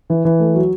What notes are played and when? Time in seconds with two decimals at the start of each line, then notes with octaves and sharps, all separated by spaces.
0.10 E3
0.25 E3
0.40 A3
0.54 F#3